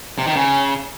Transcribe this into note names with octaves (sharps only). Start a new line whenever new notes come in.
C3
D#3
C#3